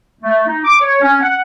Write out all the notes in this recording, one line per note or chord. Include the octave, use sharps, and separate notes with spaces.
A3
D#4
D6
C#5
C#4
F#5